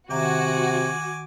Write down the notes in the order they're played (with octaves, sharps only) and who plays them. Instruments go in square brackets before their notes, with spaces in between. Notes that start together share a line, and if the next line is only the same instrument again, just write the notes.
[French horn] C3 [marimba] D#3 E5 A#5 [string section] F#4 [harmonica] G#5 D6